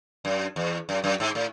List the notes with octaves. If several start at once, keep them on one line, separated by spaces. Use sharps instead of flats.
F#2
E2
F#2
F#2
G#2
A2